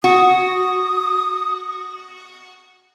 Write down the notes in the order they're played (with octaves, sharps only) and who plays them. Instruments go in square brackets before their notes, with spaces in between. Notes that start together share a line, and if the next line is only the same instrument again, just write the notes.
[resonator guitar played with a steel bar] F#4 [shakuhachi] D#6